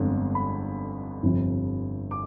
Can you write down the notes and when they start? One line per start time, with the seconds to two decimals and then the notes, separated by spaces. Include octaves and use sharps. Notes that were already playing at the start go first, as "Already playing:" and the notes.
Already playing: G1 F2 D3 G#3 B3
0.35 B5
1.23 G1 F2 C3 F3 C4
2.11 D6